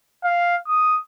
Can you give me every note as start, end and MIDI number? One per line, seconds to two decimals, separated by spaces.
0.24 0.56 77
0.68 0.97 87